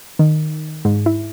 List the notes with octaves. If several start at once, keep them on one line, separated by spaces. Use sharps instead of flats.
D#3
G#2
E4